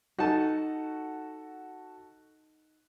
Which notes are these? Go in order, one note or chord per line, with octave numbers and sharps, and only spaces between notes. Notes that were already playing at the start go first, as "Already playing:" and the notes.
D#4 F#4 A4 A5